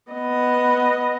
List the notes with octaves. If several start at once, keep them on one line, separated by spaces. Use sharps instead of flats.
B3 D#5